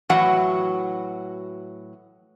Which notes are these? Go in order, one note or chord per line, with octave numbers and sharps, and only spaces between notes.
A2 E3 F#3 F#4 F#5